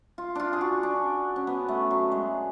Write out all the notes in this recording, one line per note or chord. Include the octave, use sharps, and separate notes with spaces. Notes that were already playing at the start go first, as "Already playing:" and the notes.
F4
D4 F4
G#4
F#4
D4
C#4
B3
A3
F#3
G#3